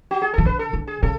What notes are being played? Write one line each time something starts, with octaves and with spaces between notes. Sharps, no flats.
F#4
G#4
F3 A4
D3 B4
A4
D3
G#4
C#3 A4